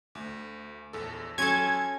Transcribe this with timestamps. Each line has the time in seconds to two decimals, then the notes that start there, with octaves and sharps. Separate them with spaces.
0.15 D2
0.93 A#1 E2 A4
1.38 F#3 C#4 A4 C6 G#6